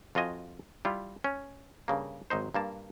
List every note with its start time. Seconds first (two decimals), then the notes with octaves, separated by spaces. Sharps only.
0.15 F2 F4 F#4 D#5 G#5
0.85 G3 E4 F4
1.24 C#4
1.88 G2 C#3 A#3
2.30 G#1 F#3 D#4 C5
2.54 G2 A#3 A5